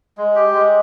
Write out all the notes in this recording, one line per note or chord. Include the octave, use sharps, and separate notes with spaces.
G#3
G4
G#3